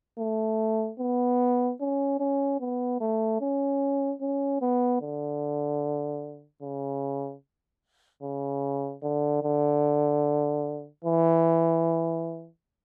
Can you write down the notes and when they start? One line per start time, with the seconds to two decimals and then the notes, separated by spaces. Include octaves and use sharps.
0.19 A3
1.00 B3
1.80 C#4
2.20 C#4
2.60 B3
3.01 A3
3.41 C#4
4.21 C#4
4.61 B3
5.01 D3
6.62 C#3
8.23 C#3
9.03 D3
9.43 D3
11.04 E3